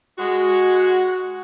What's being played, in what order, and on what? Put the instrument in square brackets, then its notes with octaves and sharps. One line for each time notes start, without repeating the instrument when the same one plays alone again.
[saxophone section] G#3 F#4